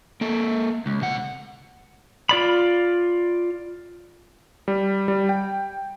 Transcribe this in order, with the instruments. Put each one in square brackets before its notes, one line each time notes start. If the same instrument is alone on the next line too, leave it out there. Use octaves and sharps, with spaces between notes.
[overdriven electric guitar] A#3 A4
C#2
C3 F#5
[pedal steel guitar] F4 D5 B5
[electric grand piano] G3
G3
G5